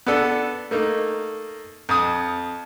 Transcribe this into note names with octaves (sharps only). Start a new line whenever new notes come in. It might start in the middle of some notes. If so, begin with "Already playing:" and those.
B3 D4 A4
A3 A#3 D#4
F2 D#6